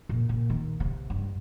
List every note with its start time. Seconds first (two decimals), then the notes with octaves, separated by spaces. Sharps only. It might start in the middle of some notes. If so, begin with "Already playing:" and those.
0.09 A#2
0.29 A#2
0.50 D#3
0.80 C3
1.10 G2